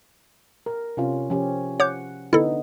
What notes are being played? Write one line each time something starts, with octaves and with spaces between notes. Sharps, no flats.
A#4
C3 C#4 F4
F3 C#4 G4
C#5 F#5 D6 G6
D3 B3 D#4 E4 A4